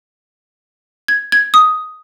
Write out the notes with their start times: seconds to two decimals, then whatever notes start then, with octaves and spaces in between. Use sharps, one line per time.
1.08 G#6
1.32 G#6
1.54 D#6